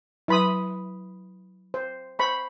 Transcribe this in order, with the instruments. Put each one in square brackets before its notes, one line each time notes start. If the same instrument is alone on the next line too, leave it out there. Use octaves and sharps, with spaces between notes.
[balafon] F#3 B4 C6 [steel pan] E4 B5 D#6
[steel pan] C5
C5 B5 C#6